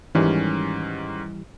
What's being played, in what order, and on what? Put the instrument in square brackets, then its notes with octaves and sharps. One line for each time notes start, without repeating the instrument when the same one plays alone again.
[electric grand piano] G#2 D#3 C#4 [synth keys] E3 G3